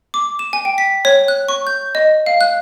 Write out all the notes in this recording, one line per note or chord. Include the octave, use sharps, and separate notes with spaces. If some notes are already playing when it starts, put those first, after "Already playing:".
D6
E7
G#5
G5
B6
C#5
F#6
C#6
G6
D#5
F5
F#6